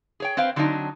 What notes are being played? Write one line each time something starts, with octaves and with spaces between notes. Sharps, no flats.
G#4 C#5 G5
C4 B4 C5 F5 G5
D3 F#3 C4 D4 D#4